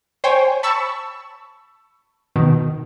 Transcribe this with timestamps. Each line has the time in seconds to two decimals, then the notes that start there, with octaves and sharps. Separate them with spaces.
0.24 C5 C#5 G5 G#5
0.63 A5 B5 C#6 E6
2.36 B2 D#3